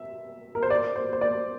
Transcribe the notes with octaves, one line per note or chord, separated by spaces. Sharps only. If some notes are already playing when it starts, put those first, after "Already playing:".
Already playing: E5
A#4
C5
D5
C5
C5
D5